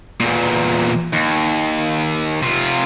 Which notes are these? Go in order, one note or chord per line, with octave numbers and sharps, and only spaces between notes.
E2 A#2
D#2
C3 F4